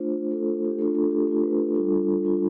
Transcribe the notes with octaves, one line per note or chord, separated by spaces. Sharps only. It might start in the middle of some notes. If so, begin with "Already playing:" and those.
Already playing: A3 D4 F4 C5
A3 D4 F4 A4
G4
A3 D4 F4 A4
A4
G4
A3 D4 F4
B4
B4
G3 D4 F4 A4
G3 D4 F4